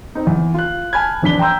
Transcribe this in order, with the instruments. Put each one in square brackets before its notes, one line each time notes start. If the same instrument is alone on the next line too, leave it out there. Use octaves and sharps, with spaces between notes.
[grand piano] C4 D#4
E2
F4 F#6
G#5 A5 B5 F6 G#6
E1 A#1 D4 B6 G7
G5 A#5 C6 E6 G6